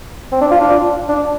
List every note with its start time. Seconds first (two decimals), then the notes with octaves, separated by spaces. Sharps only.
0.32 C4
0.41 D4
0.51 F4
0.61 D4
1.09 D4